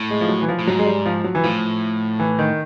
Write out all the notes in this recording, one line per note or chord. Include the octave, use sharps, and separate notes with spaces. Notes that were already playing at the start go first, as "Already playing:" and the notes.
Already playing: A2
G#3
F3
F#3
E3
F3
A2
G#2 F#3
G#3
G3
F3
F#3
E3
A2 F3
E3
D#3